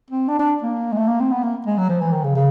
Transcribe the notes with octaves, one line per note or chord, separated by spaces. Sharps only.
C4
D4
D4
A#3
G#3
A3
A#3
C4
B3
A#3
G#3
F#3
F3
E3
D#3
C#3
C#3